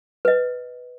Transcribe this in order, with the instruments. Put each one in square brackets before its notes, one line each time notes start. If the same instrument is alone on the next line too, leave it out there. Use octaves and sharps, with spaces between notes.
[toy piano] B4 D#5